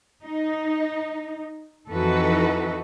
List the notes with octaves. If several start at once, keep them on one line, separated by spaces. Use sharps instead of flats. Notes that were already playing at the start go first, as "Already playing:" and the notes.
D#4
F2 E3 D#4 F#4 A4 B4